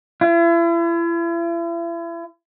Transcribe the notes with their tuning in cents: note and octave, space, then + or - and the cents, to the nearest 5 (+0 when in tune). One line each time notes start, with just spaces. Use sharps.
E4 +40